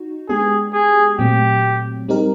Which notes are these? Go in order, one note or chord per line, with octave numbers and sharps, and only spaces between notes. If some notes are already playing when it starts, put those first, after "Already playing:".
Already playing: D#4 F#4
G#3 B3 D4 G4 G#4
G#4
A#2 F#3 A3 C4 G4
G3 C4 D#4 G4 A#4